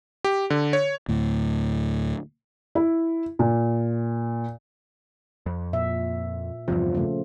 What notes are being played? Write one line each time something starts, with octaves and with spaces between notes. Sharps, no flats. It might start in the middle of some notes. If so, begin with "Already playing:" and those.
G4
D3
C#5
D2 A2
E4
A#2
F2
A#2 E5
E2 G2 C3 F3
C#3 A3